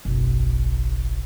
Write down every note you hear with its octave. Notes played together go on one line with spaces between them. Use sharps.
F#1 B1